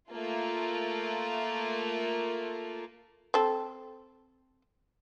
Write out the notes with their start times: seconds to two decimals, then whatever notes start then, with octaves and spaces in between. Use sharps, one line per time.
0.11 A3 A#3 F4
3.34 C4 A4